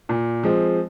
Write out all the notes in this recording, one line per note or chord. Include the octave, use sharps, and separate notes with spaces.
A#2
F3 G#3 C4